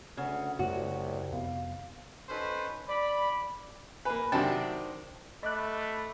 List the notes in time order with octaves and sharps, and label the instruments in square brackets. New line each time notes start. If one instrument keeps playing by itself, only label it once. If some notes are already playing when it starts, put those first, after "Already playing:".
[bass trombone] D2 [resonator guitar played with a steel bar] C#3 [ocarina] F#5
[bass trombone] C2 [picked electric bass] F#2 C#3 A3 [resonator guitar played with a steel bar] F#4 [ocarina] C#5
[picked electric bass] F2 C3 B3 [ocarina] F5
[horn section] C#4 D#4 F#4 A4 B4 C5
D5 B5
[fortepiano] A#3 B4 [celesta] G#5 B5
[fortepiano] C3 F#3 A5 [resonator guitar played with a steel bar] D#3 C4 D4 [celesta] G5
[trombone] A3 [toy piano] D#5 [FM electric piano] B5 D6 F#6